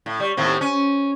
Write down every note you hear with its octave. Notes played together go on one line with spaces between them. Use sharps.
A2
G3
D#2 A2 C4
C#4